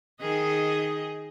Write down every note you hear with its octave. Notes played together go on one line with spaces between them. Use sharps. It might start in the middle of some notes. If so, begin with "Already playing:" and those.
D#3 G#4 D#5